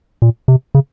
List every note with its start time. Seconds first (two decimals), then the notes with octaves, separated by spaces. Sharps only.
0.22 A#2
0.48 C3
0.75 C#3